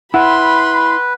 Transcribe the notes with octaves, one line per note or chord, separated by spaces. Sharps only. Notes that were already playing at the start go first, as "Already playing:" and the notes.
E4 B4 F#5 B5 C6